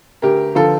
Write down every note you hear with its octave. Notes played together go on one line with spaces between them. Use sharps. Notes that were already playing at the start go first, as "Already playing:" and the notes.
D2 G4 A#4
D3 F3 F4 A4